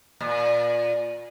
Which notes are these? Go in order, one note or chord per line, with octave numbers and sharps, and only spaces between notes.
A#2